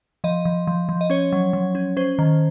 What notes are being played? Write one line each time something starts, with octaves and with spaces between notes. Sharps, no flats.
F3 D#5
F3
F3
F3
D#5
C#4 C#5
F#3
F#3
C#4
C#4 C5
D#3